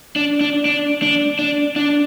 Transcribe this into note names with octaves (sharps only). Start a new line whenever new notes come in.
D4
D4
D4
D4
D4
D4